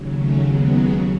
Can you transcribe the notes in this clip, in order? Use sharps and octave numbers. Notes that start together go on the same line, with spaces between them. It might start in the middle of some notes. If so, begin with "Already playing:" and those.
Already playing: D#2 C#3 F#3
A3 C#4
G#3 B3